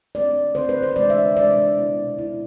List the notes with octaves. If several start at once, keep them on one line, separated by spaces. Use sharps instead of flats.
D3 A3 C4 D5
D3 A3 C4 C5
B4
C5
C3 E3 G#3 D4 D5
E5
C3 E3 G#3 D4 D5
B2 B3 E4
B2 B3 E4